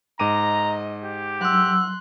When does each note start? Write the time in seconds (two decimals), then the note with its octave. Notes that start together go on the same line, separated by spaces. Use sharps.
0.19 G#2 D#5 A#5 D6 D#7
1.04 G4
1.41 F#3 C6 E6 F#6